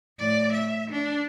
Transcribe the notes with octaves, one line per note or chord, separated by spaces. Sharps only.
A2 D5
E5
D4